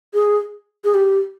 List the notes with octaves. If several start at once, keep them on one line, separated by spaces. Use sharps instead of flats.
G#4
G#4
G4